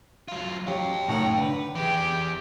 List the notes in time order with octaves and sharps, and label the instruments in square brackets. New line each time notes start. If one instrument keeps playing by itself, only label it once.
[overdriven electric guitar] F#3 F4
[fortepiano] F#3 C#4 G4 [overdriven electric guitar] F5 G5
[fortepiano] F#2 A2 D#3 [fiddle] F#5 A#5
[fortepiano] D3 [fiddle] B4
[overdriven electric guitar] E3 G#4 [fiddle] G4